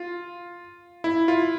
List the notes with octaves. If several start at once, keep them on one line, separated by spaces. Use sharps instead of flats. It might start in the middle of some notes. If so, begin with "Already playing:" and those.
Already playing: F4
E4
F4